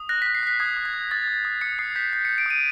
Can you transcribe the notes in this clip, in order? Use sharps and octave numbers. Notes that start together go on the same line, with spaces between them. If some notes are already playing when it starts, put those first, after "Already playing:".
Already playing: D#6
F#6 A#6
F#6 B6
C7
F#6 B6
D#6 G#6
D#6
G#6
D#6
D#6 A6
D#6
D#6
D#6 C#7
D#6 C7
G6 B6
G6 C7
G6 C#7
D7
D#6 D#7